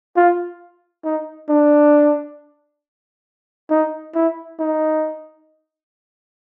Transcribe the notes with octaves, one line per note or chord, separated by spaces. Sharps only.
F4
D#4
D4
D#4
E4
D#4